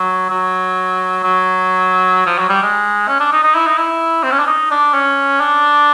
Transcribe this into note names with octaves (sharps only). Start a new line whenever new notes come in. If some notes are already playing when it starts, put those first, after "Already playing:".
Already playing: F#3
F#3
F#3
F3
F#3
G3
G#3
C#4
D4
D#4
D#4
E4
D#4
E4
C4
C#4
D4
D#4
D4
C#4
D4